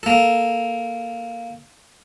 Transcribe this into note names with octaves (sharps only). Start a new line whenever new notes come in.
A#3 A4